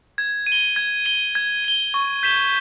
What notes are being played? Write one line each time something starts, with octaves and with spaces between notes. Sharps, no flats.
G#6
D#7
G7
G#6
D#7 G7
G#6
D#7 G7
C#6
G6 B6 E7 G7